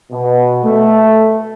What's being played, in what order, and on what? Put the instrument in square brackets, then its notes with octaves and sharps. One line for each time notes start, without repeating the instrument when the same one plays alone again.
[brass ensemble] B2
A3